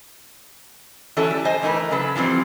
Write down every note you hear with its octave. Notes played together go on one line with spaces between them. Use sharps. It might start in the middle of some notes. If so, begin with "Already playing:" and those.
E3 C#4 F#4 A4 C#5
G3
C5 D#5 G#5
E3 A3 D#4 G#4 A#4 B4
C#3 F#3 A4 B4
E3 F3 G3 C4